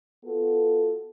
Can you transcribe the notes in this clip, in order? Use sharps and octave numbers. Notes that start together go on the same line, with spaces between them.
B3 F4 F#4 A4